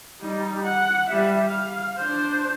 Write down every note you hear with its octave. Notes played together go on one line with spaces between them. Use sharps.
G3 D#4
F#5
G3 E5
F5
D4 C5